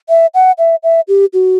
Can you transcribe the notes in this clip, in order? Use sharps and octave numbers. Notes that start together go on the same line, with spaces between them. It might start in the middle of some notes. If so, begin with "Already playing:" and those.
E5
F#5
E5
E5
G4
F#4